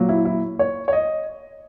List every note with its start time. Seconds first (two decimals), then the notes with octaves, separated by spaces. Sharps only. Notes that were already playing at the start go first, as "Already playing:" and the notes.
Already playing: A#2 F#3
0.09 E4
0.25 E4
0.59 C#5
0.88 C#5
0.93 D#5